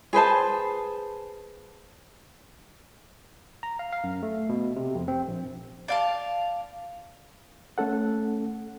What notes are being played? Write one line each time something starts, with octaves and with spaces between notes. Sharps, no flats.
G#4 B4 C5 A5
A#5
F5
F5
F#2
A3
B2
C3
F2
C4
A#1
D5 F5 A5
A3 C#4 A4 F#5